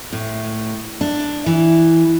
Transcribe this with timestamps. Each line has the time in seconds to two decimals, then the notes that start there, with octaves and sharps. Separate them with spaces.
0.12 A2
1.01 D4
1.46 E3